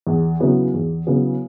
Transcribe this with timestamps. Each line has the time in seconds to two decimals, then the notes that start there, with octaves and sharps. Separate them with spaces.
0.07 E2
0.40 C#3 F#3 B3 E4
0.74 E2
1.07 C#3 F#3 B3 E4